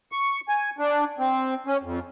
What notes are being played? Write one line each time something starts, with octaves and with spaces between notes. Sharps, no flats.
C#6
G#5
D4
C4
C#4
F2